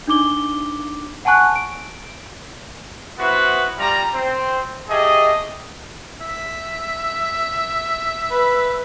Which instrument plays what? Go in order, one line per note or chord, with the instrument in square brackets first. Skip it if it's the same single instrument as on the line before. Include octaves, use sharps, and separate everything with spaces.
[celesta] D4 D#4 D6 G7
F#5 G#5 A5 C#6 F#6
D7
[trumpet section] B3 E4 F#4 B4 C5
G3 F4 A#5
C4 C5
A3 G4 G#4 D#5
[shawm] E5
[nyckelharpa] B4